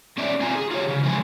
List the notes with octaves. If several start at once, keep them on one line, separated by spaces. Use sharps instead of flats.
B3 C#4 D5 E5
C4 F4 G#5 A#5
G#4
F4 G4 C#5
C#3
D3 F3 G#3 G#5